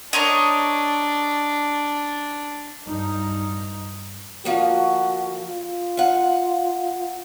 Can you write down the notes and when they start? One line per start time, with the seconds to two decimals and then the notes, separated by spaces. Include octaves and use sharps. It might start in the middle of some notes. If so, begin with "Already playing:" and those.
0.13 D4 A#4 C#5 D#5
2.88 G2 D#4
4.45 D2 F3 A#3 F#4
5.46 F4
5.97 F5 F#5